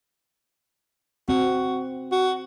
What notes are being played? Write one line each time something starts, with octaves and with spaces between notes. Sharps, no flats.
C4 F#4
F#4